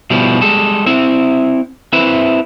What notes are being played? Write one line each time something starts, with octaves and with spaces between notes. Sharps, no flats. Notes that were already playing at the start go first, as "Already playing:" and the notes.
B2 F3 G3 E4
G3 G#3 A4
C4 E4 E5
C4 E4 B4 E5